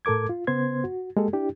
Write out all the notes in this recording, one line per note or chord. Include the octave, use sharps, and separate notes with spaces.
A2 A4 A#4 D6 G#6
F4
C#3 B3 C5 C6 G#6
F#4
G#3 A#3 G4 A4
D4 E4 G4